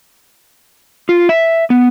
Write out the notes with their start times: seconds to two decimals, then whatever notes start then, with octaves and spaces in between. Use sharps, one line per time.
1.09 F4
1.29 E5
1.70 B3